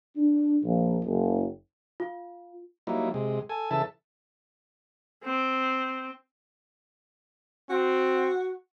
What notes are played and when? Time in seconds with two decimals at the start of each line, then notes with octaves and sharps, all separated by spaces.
0.16 D4
0.63 A#1
1.04 F#1
2.00 F4
2.87 F#3 G3 A#3 D#4 E4
3.14 C3 G#3
3.49 A4 G#5
3.71 C#3 E3 A4 E5 A5
5.23 C4
7.70 C4 F#4